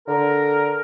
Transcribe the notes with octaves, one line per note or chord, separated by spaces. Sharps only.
D3 A#4